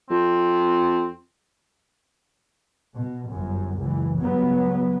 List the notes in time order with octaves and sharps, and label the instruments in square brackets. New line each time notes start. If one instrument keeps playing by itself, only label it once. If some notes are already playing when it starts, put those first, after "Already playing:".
[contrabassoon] F2 [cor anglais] C4
[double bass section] B2
G1 F#2
F#1 C#2 E3
C#2 G2 F#3 B3